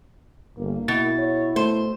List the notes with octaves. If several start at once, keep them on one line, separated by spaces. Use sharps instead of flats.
G1 A#3
B2 E4 A6
C#5
B2 A3 C5